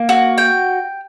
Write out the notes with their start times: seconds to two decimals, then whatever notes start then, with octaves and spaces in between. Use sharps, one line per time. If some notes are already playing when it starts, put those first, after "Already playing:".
Already playing: A#3
0.09 F#4
0.38 G5